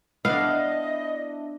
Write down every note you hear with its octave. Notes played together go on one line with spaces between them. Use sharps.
B3 D4 E4 D#5 F5